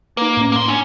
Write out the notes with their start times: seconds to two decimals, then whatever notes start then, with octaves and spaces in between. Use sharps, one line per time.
0.17 A#3 D#4 B4
0.37 A2 C#4
0.52 A#3 C6
0.68 C#4 D4